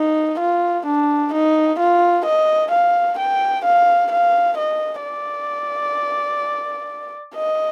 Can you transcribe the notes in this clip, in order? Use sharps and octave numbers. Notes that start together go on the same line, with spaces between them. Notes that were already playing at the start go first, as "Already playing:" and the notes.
Already playing: D#4
F4
D4
D#4
F4
D#5
F5
G5
F5
F5
D#5
D5
D#5